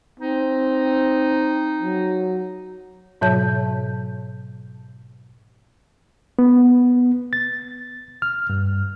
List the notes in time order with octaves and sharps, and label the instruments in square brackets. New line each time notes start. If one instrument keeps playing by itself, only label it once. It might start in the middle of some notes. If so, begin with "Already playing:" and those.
[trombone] C4 [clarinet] D#4
[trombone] F#3
[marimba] G#2 B2 F#3 C#5 A5 G6
[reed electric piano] B3
A6
F6
G2